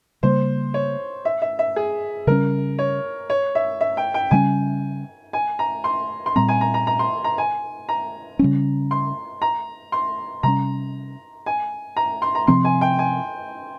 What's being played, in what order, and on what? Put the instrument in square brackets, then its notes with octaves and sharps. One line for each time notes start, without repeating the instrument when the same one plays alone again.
[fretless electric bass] C#3 G3 A#3 [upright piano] C5
[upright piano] C#5
E5
E5
E5
G#4
[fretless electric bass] C#3 G3 C#4 [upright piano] A#4
[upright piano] C#5
C#5
E5
E5
G5
G5
[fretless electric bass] C#3 G3 A#3 C#4 [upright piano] G#5
[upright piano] G#5
A#5
C6
C6
[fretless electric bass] A#2 G3 C4 [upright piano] A#5
[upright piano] G#5
A#5
A#5
A#5
C6
A#5
G#5
A#5
[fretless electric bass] C#3 G3 C#4
[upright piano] C6
A#5
C6
[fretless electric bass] C3 G3 C#4 [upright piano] A#5
[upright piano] G#5
A#5
C6
A#5
[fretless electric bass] C3 F3 C4 [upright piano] C6
[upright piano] G#5
G5
G#5